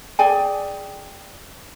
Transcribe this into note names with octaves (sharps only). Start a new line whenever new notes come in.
G#4 D5 G5 G#5